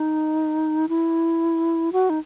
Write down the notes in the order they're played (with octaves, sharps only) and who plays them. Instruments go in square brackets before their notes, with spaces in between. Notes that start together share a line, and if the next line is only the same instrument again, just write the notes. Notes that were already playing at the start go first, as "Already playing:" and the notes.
Already playing: [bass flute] D#4
E4
F#4
D#4